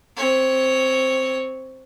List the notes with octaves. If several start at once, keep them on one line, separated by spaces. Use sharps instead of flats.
C4 C#5